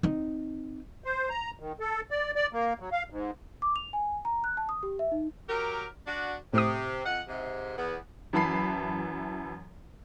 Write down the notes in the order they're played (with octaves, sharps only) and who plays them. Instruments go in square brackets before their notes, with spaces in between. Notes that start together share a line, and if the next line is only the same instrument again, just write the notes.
[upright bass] C4 D#4
[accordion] C5
A#5
D#3
A4
D5
D5
A#3
F#3
F5
G#2
[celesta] D6
F7
G#5
A#5
F#6
A5
D#6
G4
E5
D#4
[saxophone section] F#3 G4 A#4
D4 F#4
[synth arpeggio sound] A2 D#6 [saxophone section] C3
[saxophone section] F2 D#5 F#5
G#2 C3
E2 B3
[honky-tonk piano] F#2 E3 A5 B5 C7